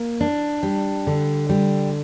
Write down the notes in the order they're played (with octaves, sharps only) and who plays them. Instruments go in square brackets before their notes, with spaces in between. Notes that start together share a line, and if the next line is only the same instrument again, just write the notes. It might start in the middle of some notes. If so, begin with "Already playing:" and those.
Already playing: [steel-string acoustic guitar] A#3
D4
G3
D3
G3